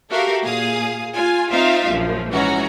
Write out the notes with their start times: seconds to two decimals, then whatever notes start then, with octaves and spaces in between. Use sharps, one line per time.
0.10 F#4 G4 A4 A#4 E5 F5
0.43 A#2 G#4 F5 D#6
1.15 F4 G#5
1.51 C4 D#4 F4 E5 F5
1.91 A#1 F#2 F3
2.29 G#2 E3 C#4 F#4 A#5